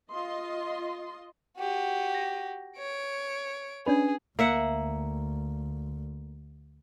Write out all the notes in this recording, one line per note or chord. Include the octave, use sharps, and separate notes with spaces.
F4 D#5 C6
F#4 G4
A#6
C#5 D7
C#4 D4 G#4 B4
D2 A#3 E5 F#5